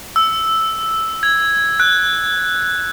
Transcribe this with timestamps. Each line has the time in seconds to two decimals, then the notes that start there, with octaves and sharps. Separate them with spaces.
0.16 E6
1.23 G#6
1.80 F#6